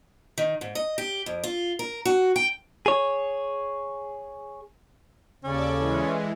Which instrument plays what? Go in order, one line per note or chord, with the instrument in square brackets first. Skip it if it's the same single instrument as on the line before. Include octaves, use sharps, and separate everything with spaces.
[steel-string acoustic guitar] D#3
G#2
D#5
G4
F2
F4
A#4
F#4
G5
[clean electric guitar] G#4 C#5
[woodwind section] D#2 C#3 [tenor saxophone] C#4 [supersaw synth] A4 D5
[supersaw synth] E3 G#3